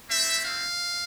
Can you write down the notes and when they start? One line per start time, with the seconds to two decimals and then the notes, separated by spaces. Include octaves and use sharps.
0.09 A3 C4 E4 E5
0.45 F5